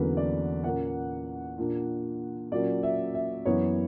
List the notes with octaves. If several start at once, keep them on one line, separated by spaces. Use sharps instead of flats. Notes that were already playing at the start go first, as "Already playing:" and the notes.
Already playing: E2 D3 F#3 A#3 C#4 B4
D5
A#2 A#3 C#4 F#5
A#2 A#3 D4
A#2 F#3 A#3 C#4 D5
E5
E5
F#2 E3 B3 C#5